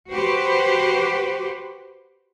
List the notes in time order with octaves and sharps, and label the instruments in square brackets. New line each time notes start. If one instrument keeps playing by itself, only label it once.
[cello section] F#4 G4 B4 C5